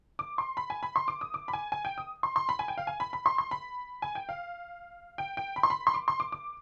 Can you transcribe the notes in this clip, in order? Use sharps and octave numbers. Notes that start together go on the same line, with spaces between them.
D6
C6
B5
G#5
B5
C6
D6
D#6
D6
B5
G#5
G#5
G5
D#6
C6
C6
B5
G#5
G5
F5
G#5
B5
B5
C6
C6
B5
G#5
G5
F5
G5
G5
B5
C6
B5
C6
D6
C6
D6
D6